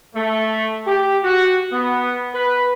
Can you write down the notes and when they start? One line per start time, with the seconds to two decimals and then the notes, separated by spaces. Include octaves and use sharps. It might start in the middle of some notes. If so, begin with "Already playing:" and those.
0.15 A3
0.86 G4
1.24 F#4
1.72 B3
2.35 B4